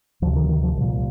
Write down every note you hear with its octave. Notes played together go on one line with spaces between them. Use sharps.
D2 C3 F3
D#3
D#3
F3
C2 A#2